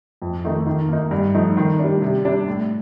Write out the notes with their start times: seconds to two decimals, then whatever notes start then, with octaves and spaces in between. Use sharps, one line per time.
0.22 F2
0.44 D#3 A3 D#4
0.66 D#3
0.89 A#3 D#4
1.11 G2
1.35 F3 A3 D#4
1.57 D#3
1.79 G3 D4
2.02 C3
2.25 G3 D4
2.47 A2